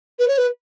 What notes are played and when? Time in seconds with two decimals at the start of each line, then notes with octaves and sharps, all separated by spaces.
0.19 B4
0.28 C#5
0.38 B4